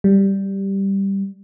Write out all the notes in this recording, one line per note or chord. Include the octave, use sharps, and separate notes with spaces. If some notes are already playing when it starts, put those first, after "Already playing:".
G3